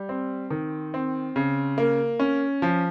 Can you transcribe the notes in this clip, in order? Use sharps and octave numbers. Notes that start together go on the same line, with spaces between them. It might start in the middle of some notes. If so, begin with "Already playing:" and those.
Already playing: G3
C4
D#3
C4
C#3
A#3
C#4
F3